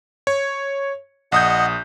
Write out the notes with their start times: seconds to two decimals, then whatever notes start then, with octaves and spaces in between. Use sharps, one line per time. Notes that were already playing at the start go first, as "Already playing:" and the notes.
0.27 C#5
1.32 A#1 D#5 F#5 D#6 G6